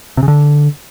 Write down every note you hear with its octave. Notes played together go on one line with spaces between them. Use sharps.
C3
C#3
D3